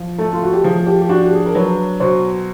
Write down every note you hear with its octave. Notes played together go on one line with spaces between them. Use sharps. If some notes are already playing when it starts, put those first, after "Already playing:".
Already playing: F3
A3 A4
F4
F#4
G4
F3 G#4
G#4
G4
G4
D4 F#4
G4
G#4
A#4
F#3 B4
B2 C5